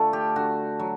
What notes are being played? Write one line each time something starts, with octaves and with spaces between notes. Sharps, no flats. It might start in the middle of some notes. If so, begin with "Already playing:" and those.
Already playing: D3 A3 F4
G4
D3 F#4
F#3